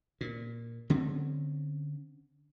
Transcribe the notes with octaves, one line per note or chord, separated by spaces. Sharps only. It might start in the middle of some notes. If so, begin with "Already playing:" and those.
A#2
D3 C4 C#4